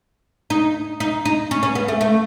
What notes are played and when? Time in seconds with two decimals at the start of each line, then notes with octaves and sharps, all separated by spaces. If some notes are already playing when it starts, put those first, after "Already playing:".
0.50 D#4
1.00 D#4
1.25 D#4
1.51 C#4
1.63 C#4
1.75 B3
1.88 A3
2.01 A3